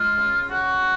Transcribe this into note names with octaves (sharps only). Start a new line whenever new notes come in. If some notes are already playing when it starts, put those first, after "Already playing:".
Already playing: G#3 F4
C#3
C#3 F#4